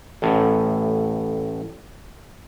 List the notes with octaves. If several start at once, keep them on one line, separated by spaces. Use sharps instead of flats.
A1 A2